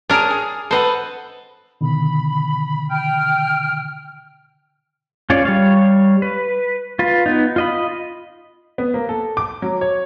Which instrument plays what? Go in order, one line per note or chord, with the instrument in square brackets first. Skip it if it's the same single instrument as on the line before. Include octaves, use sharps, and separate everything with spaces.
[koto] D4 A#4 [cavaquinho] G#4 C#5
[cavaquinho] G#4
[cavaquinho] A4 B4 F#5 [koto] C5 D#5
[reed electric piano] B2 D3 D#3 [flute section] B5
[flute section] G5 F6
[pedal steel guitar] G#3 C#4 F4 C#5 D5
G3 C#5 F5
B4
F4 B4
B3 D#4
F4 D#5 B5
[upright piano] B3
A#3
A4
D6
F#3
C#5